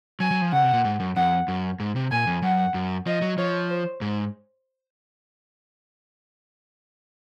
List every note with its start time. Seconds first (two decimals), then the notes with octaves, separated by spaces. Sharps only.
0.20 F#3 G#5
0.31 F#3
0.42 F3
0.52 C#3 F#5
0.63 C3
0.73 A#2
0.85 G#2
1.00 F#2
1.16 F2 F#5
1.48 F#2
1.80 G#2
1.96 C3
2.11 A#2 G#5
2.27 F2
2.42 F#2 F#5
2.74 F#2
3.06 F3 D#5
3.22 F#3
3.38 F3 C#5
3.70 C5
4.01 G#2